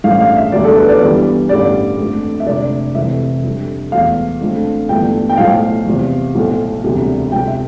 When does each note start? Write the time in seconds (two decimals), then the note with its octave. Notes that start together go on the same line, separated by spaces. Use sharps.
0.04 A1 G2 F3 A3 F5
0.20 F5
0.37 E5
0.52 E1 D2 D3 G3 D5
0.64 A4
0.77 B4
0.89 D5
1.01 G1 G2 E3 G3
1.49 A1 G2 D3 G3 D5
1.98 F2 D3 A3
2.40 E5
2.46 F1 F2 D3 D5
2.95 F1 F2 C3 E3 E5
3.43 F2 D3 G3
3.92 E1 E2 B2 A3 F5
4.41 F2 D3 F3 A3
4.89 G1 G2 E3 A3 G5
5.29 G5
5.37 B1 A2 F3 A3 F5
5.86 E2 C3 F3
6.35 B1 A2 F3 A3
6.83 E1 D2 C3 G3
7.31 F2 C3 F3 G5
7.47 E5